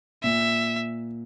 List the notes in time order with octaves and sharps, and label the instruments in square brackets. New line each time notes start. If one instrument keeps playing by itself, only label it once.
[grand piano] A#2 [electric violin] E5